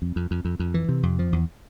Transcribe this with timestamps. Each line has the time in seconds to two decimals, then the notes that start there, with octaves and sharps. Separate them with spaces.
0.02 F2
0.16 F2
0.31 F2
0.45 F2
0.59 F2
0.74 E3
0.89 C3
1.03 F2
1.19 F3
1.33 E2